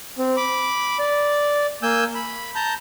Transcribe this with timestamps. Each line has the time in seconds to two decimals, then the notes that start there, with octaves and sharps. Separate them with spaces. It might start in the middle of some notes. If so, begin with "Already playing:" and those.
0.18 C4
0.37 B5 D6
0.99 D5
1.83 A#3 G#5 E6 G6
2.15 B5
2.55 A5 A#5 G6